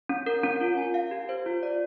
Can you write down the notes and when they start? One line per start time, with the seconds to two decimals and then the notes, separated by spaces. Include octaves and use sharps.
0.09 C#4
0.26 A#4
0.44 C#4
0.61 F4
0.77 G#5
0.94 F5
1.11 G4
1.29 C5
1.46 F4
1.63 D5